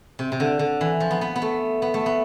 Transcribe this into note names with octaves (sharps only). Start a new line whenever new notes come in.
C3
C3
D3
D3
E3
F3
B3
B3
B3
A3
B3
A3
B3